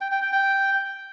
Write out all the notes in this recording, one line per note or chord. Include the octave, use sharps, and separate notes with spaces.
G5
G5
G5
G5